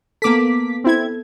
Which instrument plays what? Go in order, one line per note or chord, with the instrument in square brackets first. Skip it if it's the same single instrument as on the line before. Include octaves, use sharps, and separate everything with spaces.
[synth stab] A#3 D6 B6 [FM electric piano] B3 A4
[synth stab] C4 E4 G#6